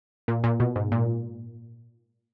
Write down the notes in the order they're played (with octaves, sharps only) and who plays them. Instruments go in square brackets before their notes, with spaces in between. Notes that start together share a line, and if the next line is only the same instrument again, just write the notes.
[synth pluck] A#2
A#2
B2
G#2
A#2